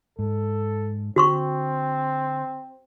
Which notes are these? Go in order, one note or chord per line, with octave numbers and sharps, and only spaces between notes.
G#2 A4
D3 C4 F#4 C6 C#6